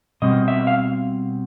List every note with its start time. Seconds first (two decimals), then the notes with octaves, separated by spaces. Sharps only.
0.22 B2 G3 C4 D#5
0.48 E5
0.67 F5